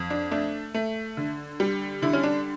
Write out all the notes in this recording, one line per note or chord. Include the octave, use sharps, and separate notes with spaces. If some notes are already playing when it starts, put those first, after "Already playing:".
Already playing: F2
D4
A3 D4
A3
D3
G3
D3 E4
C#4
D4